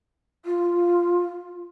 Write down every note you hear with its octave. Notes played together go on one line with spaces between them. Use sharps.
F4